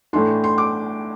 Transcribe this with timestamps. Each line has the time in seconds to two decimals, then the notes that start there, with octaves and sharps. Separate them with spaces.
0.13 A2 E3 A3 D4 C6
0.44 C6
0.58 D6